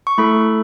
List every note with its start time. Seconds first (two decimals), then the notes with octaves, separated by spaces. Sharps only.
0.07 C#6
0.18 A3 E4 A4 B5